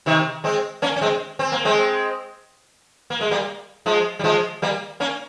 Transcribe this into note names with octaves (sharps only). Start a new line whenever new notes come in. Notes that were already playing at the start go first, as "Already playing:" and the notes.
C3 D#3
G#3 C4
A#3 C#4
C#4
G#3 C4
C4
A#3
G#3 C4
A#3
G#3
G3 A#3
F3 G#3
G3
F3 G#3
G3 A#3
A#3 C#4